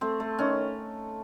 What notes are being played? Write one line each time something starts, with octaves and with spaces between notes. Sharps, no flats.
A3 C4
A3
D#3 C#4